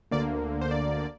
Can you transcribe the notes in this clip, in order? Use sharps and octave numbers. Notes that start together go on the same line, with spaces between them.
D2 D3 A#3 D5
C5
D5